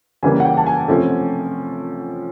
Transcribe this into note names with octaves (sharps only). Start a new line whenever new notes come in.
C#3 E3 G3 A#3 G#5
F#5
G5
A5
G#5
C3 F3 A3 C#4